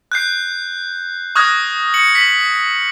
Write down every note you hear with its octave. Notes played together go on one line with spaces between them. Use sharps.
F#6 G6 C7
C#6 D#6 F6 F#6 G#6 A#6
C#7 F#7
B6 F#7